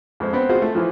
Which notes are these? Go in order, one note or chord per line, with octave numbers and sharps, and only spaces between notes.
F2 G#3 C5
B3 C4
F4 F#4 G#4 C5
A3
E3 F3